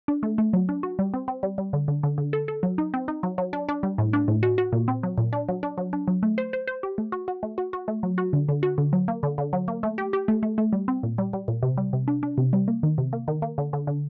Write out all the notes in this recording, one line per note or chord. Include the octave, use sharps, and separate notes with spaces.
D4
A3
A3
F#3
D4
F#4
G3
C4
C4
G3
G3
D3
D3
D3
D3
A4
A4
F#3
D#4
C4
D#4
F#3
F#3
D4
D4
G3
A2
D4
A2
F#4
F#4
A#2
C4
F#3
A#2
D4
F#3
D4
F#3
D4
F#3
A3
C5
C5
C5
G4
A3
F#4
F#4
A3
F#4
F#4
A3
F#3
F#4
D3
D3
F#4
D3
F#3
A#3
D3
D3
F#3
A#3
A3
G4
G4
A3
A3
A3
G3
C4
A#2
G3
G3
A#2
C3
G3
C3
D4
D4
C3
G3
A#3
D#3
C3
A#3
D#3
A#3
D3
D3
D3